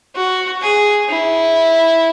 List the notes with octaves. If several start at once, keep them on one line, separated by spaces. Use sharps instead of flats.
F#4
G#4
E4